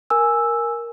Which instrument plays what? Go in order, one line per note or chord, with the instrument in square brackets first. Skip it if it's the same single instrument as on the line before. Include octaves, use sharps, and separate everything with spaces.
[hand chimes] A#4 G#5 E6